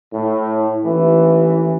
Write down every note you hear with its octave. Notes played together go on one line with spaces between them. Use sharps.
A2
A1 D#2 E3